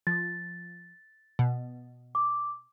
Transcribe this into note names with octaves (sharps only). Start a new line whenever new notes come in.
F3 A6
B2
D6